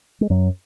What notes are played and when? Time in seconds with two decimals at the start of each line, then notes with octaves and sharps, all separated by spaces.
0.21 G#3
0.30 F#2 F#3